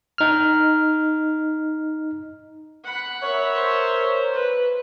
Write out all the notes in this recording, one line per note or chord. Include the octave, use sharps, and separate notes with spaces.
D#4 F6
F#5 B5
A#4 C#5 E5
C5
B4